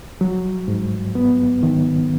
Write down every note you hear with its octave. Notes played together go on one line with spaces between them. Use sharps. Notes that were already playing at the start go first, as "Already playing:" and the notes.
F#3
G#2
B3
D#3